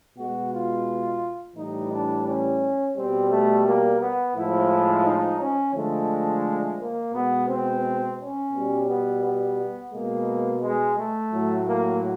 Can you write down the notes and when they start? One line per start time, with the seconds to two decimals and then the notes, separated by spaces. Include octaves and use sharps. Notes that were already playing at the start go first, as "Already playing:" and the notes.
0.17 B2 G#3 F#4
0.52 F4
1.56 A2 E3 G3 D#4
1.91 D4
2.26 C#4
2.95 B2 G3 C4
3.30 A3
3.65 A#3
4.00 B3
4.35 A2 F3 G#3 E4
5.04 D#4
5.39 C#4
5.74 D3 F3 G#3 A3
6.79 A#3
7.13 B2 G#3 B3
7.49 C4
8.18 C#4
8.53 B2 G3
8.88 B3
9.22 B3
9.92 B2 G#3 A#3
10.62 G#3
10.97 A3
11.31 A2 F#3
11.67 A#3